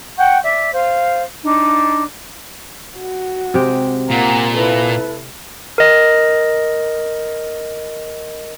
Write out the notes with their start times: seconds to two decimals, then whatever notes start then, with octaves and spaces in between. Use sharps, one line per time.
0.18 F#5 G5 C#6 G6
0.42 D5 E5
0.73 C5 F5
1.42 D4 D#4
2.98 F#4
3.54 C3 G#3 G4
4.10 A#2 A#4 F#5
4.55 E4 A4 B4
5.78 A#4 D#5